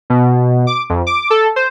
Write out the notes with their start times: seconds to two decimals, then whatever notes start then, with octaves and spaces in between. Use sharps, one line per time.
0.10 B2
0.67 D6
0.90 F2
1.07 D6
1.30 A4
1.56 C5